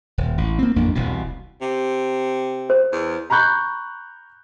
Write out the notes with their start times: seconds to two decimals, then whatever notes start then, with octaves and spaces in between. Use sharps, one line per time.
0.18 D#1
0.38 A1
0.59 A#3 C4
0.76 A1 F2 A#3 D4
0.95 E1 C2 B2
1.61 C3
2.70 C5
2.93 E2
3.30 A#5 B5 C#6 F#6 G6